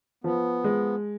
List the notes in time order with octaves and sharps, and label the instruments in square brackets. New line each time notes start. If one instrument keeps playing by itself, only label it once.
[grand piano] F3 [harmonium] B3
[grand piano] G#3